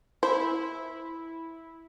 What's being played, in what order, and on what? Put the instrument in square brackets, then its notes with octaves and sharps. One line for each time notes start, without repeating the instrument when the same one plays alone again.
[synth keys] E4 [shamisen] C5